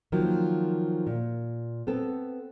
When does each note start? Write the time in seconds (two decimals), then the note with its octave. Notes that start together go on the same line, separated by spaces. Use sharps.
0.12 D#3 F3 F#3 A#3
1.07 A#2
1.87 B3 C4 A4